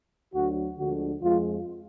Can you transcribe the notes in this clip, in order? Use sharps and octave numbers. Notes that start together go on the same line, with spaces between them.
D2 D3 F#3 F#4
D2 D3 F3 G#3 F#4
F2 F3 G#3 F4